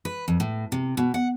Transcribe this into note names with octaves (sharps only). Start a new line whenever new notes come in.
B4
F2
A2
C3
B2
F#5